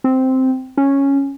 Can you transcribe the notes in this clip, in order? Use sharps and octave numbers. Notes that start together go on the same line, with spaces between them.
C4
C#4